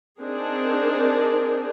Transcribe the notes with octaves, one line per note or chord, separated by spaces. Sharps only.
C4 D4 D#4 G#4 A#4